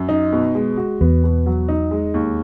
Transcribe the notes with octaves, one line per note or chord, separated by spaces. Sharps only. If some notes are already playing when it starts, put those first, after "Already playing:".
Already playing: F#2
D#4
B2
G#3
F#4
E2 B3
B2
F#3
D#4
G#3
D#2